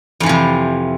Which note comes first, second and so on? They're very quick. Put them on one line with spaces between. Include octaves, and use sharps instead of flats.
F2 E3 F3 C3